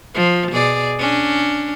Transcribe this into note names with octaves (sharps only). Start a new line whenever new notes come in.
F3
B2 G#4 D5
C#4 D4